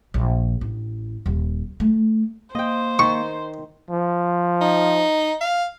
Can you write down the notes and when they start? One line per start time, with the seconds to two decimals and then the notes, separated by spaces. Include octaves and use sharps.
0.14 A#1
0.61 A1
1.26 D#1
1.80 A3
2.55 A#3 C5 D#5 G5
2.99 D#3 C#6
3.90 F3
4.61 D#4
5.41 F5